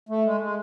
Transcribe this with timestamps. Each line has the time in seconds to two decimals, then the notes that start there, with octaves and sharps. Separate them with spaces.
0.09 A3
0.24 G#3
0.40 G#3